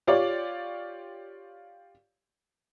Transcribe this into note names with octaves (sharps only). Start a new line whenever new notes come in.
F4 G4 C#5 D5